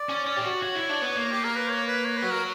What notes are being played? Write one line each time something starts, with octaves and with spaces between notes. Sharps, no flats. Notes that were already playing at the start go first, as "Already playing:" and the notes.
Already playing: D5
C#4
C#4
G4
F#4
F#4 C#5
E4
D4
B3
A#3
G4
A#4
B4
C#5
B4
C#5
B4
F#3
A#4